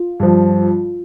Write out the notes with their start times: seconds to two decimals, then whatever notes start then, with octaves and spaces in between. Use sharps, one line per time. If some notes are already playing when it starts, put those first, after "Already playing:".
Already playing: F4
0.20 G2 F3